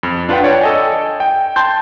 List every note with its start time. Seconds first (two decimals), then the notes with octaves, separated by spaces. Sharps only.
0.03 F2
0.29 D4 F4 B4 F#5 G5
0.44 C#5 D5 G5
0.61 A4 D#5 G#5
1.20 G5
1.56 A5 C6 G6